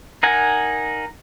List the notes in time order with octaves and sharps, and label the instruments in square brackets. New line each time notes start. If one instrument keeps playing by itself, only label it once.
[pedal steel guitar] D#4 A#4 F#5 G#5